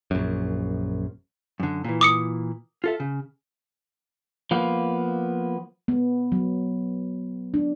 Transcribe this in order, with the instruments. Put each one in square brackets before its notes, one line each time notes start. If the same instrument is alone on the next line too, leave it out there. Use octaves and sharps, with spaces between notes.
[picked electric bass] A#1 F#2
[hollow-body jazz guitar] F#2 D3
A#2 E3
[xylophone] D6 D#6 C#7
[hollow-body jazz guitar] F4 A4 E5
C#3
[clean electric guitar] F3 A#3 B3
[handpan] B3
F#3
D4